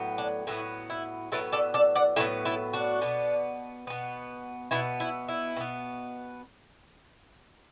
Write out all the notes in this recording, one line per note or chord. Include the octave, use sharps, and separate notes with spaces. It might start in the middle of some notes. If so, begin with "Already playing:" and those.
Already playing: A2 F#3 B3
D4
A2 F#3 B3 E4
E4
A2 F#3 B3 E4 A4
A4 D5
A4 D5
D5 F#5
A2 F#3 B3 E4 A4
E4 A4
D4 F#4
B2 B3
B2 B3
B2 B3 E4
E4
E4
B2 B3